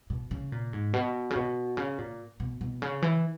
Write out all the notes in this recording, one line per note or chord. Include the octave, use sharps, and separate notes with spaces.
B2
C#3
A#2
G#2
B2
C#3
B2
C#3
A#2
B2
B2
C#3
E3